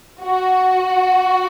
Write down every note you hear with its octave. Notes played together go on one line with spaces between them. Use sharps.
F#4